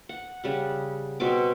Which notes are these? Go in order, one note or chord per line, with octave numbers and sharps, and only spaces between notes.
F#5
C#3 G3 F#5
B2 C4 B4 D6